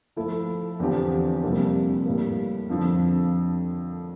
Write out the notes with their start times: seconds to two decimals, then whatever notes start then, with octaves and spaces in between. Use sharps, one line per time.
0.16 F3 A3 E4 A4
0.80 E2 D3 F3 C4 G4
1.43 F2 C3 G3 A#3 D4
2.06 A2 G3 A#3
2.69 F2 D3 F3